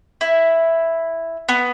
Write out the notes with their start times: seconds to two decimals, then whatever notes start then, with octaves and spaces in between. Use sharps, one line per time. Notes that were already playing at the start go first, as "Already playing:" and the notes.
0.21 E4
1.49 B3